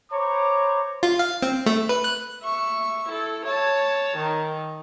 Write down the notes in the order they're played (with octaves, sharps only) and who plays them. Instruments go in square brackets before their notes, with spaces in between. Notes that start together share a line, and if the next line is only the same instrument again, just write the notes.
[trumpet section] C5 C#5 A#5 B5 D6
[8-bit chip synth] F4
F5
C4
A3
B4
F#6
[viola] E5 C#6
E4 A4
C#5 A5
D#3